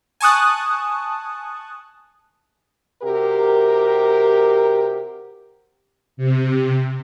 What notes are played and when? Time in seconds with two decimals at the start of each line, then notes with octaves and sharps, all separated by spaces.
0.20 G#5 A5 C#6 D#6 F#6
3.03 C3 F#4 G4 A#4
6.17 C3